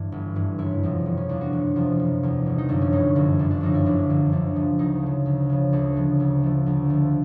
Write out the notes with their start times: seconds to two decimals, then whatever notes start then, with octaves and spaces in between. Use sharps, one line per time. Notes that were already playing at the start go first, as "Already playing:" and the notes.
Already playing: G2 E3
0.12 G1
0.36 G2 E3
0.59 F#1 E4
0.83 E2 C3 F3
1.06 F#1
1.17 C#4
1.29 E2 C3 F3 D4
1.41 F#4
1.53 F#1
1.76 E2 C3 F3
1.99 F#1
2.23 E2 C3 F3
2.46 G1
2.58 D#4
2.69 F#2 D3 F3 D4
2.81 C#4
2.93 G1 D#4
3.16 F#2 D3 F3
3.39 G1 D4
3.51 D4
3.61 F#2 D3 F3 D#4
3.74 E4
3.86 G1 D4
4.10 F#2 D3 F3
4.32 D2 D4
4.56 C#3 F3
4.79 D2 D#4
5.03 C#3 F3
5.26 D2
5.49 C#3 F3
5.73 D2 D4
5.96 C#3 F3
6.20 D2
6.43 D3 F3
6.66 D2
6.90 D3 F3